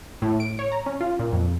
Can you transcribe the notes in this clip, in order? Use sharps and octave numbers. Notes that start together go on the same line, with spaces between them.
A2
D7
C#5
A#5
C#4
F4
A#2
F2